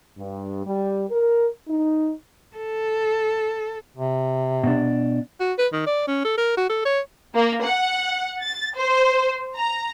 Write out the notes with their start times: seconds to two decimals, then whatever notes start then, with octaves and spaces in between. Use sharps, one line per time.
0.18 G2
0.66 G3
1.10 A#4
1.68 D#4
2.57 A4
3.97 C3
4.64 B2 D4
5.40 F#4
5.58 B4
5.73 D#3
5.87 D5
6.08 C#4
6.25 A4
6.38 A#4
6.57 F#4
6.69 A4
6.85 C#5
7.35 A#3
7.64 F#5
8.41 A6
8.76 C5
9.56 A#5